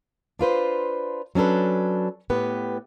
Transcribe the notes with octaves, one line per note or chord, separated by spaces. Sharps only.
D4 F4 B4 C5
F#3 C#4 D4 A4 B4
A2 B3 G4 B4